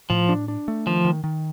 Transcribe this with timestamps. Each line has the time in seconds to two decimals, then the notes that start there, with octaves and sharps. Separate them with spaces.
0.10 A2 F3
0.29 D4
0.48 D4
0.68 A3
0.87 D#3 F3
1.05 D#3
1.24 D#3